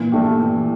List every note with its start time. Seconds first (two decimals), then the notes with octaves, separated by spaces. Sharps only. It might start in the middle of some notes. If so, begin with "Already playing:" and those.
Already playing: A#2 E3
0.12 A3 D4 G4
0.38 E3